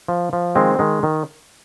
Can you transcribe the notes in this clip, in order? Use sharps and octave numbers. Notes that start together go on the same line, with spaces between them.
F3
F3
D#3 G#3 C4
D#3 G#3
D#3